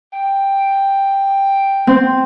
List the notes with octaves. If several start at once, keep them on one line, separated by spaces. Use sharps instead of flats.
G5
C4